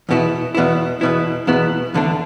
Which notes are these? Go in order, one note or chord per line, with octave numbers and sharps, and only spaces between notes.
E2 B2 B3 E4
E2 B2 B3 E4
E2 B2 B3 E4
E2 B2 B3 E4
E2 D3 A3 D4